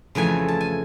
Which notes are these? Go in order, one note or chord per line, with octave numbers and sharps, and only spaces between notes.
F2 C#3 E3 A3 G#5
A5
G#5